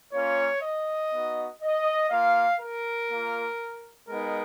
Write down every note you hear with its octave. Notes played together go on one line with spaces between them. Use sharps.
A#3 C#4 F4 C#5
D#5
B3 D#4 F#4
D#5
A#3 F4 F5
A#4
A#3 F4
G#3 B3 D#4 A#4